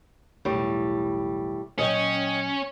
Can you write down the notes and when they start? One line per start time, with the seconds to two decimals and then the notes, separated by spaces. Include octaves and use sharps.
0.45 B1 E2 A2 G3
1.79 A#2 F#3 C#4 D#5 G5